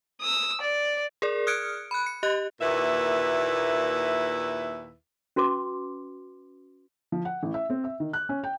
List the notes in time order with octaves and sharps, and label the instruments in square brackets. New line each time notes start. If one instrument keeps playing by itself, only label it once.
[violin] D#6 E6
D5
[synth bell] G#4 A#4 D5
D#6 F6 F#6 G#6 C#7 D7
B5 F#6
C#7
G4 D#5 F#6
[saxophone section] D#2 A#2 E4 B4 E5
[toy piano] C#4 F#4 B4 C6 D6
[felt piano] F3
F#5
A1
E5
C4
E5
D#3
F#6
C#4
G5